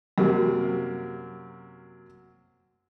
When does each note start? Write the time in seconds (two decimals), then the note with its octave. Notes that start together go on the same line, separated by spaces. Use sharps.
0.18 F#2 C3 A#3